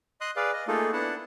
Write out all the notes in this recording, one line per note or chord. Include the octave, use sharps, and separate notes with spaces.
D#5 C6 D#6 F#6
G#4 B4 D5 F5
D#5
A3 A#3 D#4 F4 G#4 A4
B3 D4 E4 F#5 A5